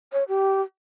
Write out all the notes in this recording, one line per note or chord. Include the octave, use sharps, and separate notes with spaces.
C#5
G4